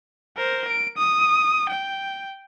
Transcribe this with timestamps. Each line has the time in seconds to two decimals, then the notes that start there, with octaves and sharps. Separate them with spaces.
0.37 A#4 C5
0.68 D7
0.98 D#6
1.69 G5